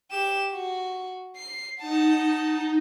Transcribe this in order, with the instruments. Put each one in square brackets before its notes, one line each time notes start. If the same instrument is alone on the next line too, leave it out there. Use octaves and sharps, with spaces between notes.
[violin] G4 E7
F#4
C7
[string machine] D#4 [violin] F#5 A5